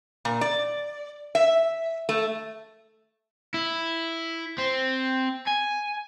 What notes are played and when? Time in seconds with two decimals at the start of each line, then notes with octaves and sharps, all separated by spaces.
0.25 A#2
0.41 D5
1.35 E5
2.09 A3
3.54 E4
4.58 C4
5.47 G#5